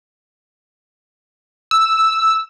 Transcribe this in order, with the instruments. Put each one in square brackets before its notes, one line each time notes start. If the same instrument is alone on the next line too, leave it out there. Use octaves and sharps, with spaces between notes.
[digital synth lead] E6